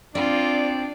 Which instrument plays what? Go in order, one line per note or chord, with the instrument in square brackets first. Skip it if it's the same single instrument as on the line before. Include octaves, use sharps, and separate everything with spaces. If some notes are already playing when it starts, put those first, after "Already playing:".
[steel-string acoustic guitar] C4 [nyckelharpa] D4 [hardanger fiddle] F4 [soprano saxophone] D5